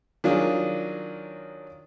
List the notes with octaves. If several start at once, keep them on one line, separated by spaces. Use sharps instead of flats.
D#3 F#3 D4 F4 G#4